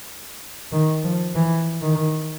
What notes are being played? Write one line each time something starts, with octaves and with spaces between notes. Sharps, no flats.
D#3
F3
E3
D#3